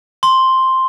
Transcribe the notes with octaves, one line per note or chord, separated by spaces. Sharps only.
C6